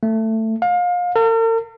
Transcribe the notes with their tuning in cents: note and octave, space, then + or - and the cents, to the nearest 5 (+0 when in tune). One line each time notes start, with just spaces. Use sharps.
A3 +15
F5 +30
A#4 -45